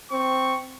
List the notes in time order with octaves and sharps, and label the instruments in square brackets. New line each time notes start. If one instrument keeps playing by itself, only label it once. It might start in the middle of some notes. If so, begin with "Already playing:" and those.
[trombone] C4 [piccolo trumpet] C#6